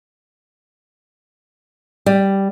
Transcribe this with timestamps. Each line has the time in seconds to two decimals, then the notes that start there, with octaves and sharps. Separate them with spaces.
2.06 G3